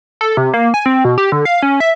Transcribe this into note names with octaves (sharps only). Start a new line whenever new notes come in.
A4
C3
A#3
G#5
C4
B2
G4
D3
F5
C#4
E5